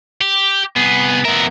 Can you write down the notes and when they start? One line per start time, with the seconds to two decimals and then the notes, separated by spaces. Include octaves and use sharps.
0.21 G4
0.76 C2 B3 G#4
1.25 F2 B3 A#4 E5